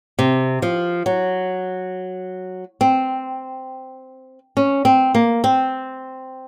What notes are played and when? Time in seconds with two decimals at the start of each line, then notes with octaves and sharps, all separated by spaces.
0.19 C3
0.62 F3
1.06 F#3
2.81 C4
4.57 C#4
4.85 C4
5.15 A#3
5.44 C4